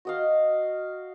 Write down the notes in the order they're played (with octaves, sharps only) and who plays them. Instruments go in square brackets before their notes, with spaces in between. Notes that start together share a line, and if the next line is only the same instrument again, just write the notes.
[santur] F#4 D#5 F5